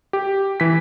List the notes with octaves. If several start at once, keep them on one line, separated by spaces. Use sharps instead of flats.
G4
E3 B6